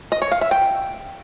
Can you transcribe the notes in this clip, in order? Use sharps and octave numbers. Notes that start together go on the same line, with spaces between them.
D#5
C#5
F5
E5
G5